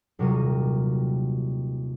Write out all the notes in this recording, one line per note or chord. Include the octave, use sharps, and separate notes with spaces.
D#1 C3 F#3 G3 A#4 D#7